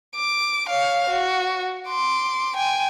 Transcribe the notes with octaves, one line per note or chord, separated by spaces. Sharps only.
D6
C#5 F5
F#4
C6 D6
G5 G#5